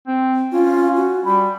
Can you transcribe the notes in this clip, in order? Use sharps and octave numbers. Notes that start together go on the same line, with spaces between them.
C4
C#4 F4
F#4
G3 B5